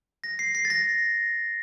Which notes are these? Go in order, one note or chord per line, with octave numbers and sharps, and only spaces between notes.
A#6
C7
C7
A6
A#6